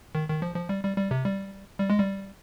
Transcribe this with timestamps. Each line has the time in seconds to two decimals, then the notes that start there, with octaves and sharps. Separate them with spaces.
0.15 D#3
0.29 D#3
0.42 F3
0.56 F3
0.69 G3
0.84 G3
0.97 G3
1.11 C3
1.25 G3
1.80 G3
1.90 G#3
1.99 G3